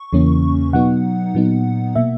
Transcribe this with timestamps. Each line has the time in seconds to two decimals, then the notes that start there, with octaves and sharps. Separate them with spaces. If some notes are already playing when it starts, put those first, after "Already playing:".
Already playing: C#6
0.13 E2 C#3 E3 A#3 C#4
0.73 B2 F#3 B3 D#4 F#5
1.35 A#2 F#3 B3 D#4
1.95 B2 A#3 E5